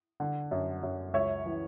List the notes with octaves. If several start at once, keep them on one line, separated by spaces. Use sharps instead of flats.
D3
F#2
F#2
C#2 C#5 E5
E3